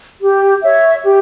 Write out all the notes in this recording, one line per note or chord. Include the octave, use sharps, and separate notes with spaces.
G4
C#5 E5
G4